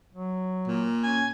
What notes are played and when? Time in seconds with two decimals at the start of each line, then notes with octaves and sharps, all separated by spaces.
0.14 F#3
0.67 A#2
1.04 C#4 G#5